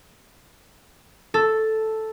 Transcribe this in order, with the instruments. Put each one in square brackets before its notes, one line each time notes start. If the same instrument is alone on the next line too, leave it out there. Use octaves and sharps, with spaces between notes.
[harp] A4